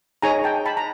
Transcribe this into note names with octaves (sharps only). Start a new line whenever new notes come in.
D#4 G#4 C#5 G#5 A#5
G5 A5
A5 B5
A#5